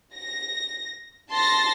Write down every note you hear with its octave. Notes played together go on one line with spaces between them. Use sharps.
A#6
A5 C6 A6 A#6